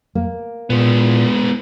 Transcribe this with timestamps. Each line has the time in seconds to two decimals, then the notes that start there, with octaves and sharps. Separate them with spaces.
0.15 A#3
0.70 A#2 G#3 B3